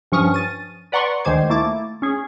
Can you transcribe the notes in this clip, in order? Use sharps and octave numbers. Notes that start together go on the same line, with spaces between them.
G2 F3 C#4 C#6 D#6 F6
A6 D#7
B4 D5 F#5 A#5 C6 C#6
D2 D#3 G#3 C5 D6 G#6
A3 A#3 E4 D6 A6
C#4 G#4